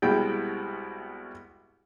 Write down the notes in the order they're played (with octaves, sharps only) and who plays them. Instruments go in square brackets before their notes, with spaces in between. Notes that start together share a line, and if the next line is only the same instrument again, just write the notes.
[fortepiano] C2 B2 G3 G#3 E4 G5